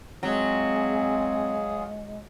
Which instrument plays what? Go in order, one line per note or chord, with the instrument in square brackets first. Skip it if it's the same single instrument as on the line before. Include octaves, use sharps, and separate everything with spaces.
[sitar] F#3 [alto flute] G#3 [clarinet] C4 [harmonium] F4 G#4